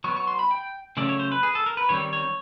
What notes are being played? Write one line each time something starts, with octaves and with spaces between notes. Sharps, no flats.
F#3 B3 C#6
C#6
C6
B5
G5
C#3 F#3 A3 C#4 D5
C#5
C5
B4
G#4
A4
A#4
B4
D#3 G3 C4 C#5
C#5